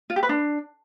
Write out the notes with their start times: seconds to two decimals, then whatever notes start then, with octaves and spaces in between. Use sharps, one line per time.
0.10 F4
0.16 G4
0.23 B4
0.29 D4